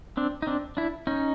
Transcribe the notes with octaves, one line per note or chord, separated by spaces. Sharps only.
C4 D4
D#4
C4 D4
D4 E4
C#4 D#4